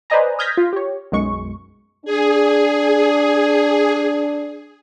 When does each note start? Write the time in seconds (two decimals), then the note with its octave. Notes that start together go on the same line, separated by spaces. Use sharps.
0.10 B4 C5 D5 D#5 G#5 A#5
0.39 D#6 F6 G6 G#6 A#6 B6
0.57 F4
0.73 G4 C#5
1.12 B1 F#2 G#3 C#6
2.05 D4 G#4